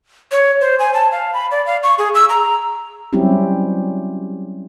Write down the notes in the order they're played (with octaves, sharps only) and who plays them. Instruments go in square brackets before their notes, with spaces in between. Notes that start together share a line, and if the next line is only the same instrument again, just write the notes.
[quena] C#5
C5
G#5
A5
F5
B5
D5
F5
C#6
G#4
E6
A#5
[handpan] F#3 G3 C4 C#4 E4 G4